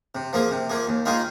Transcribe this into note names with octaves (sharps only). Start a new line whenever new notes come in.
C3
F3 A#3 G#4
C3
F3 A#3 G#4
D#2
D#3 A#3 F4 G#4